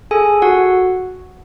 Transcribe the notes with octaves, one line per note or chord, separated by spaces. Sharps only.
G#4 A4 G#5
F#4 F#5